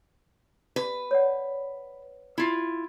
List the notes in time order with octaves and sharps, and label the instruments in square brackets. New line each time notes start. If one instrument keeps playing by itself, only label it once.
[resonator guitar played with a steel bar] B4
[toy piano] C#5 D5 F#5
[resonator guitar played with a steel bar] E4 F4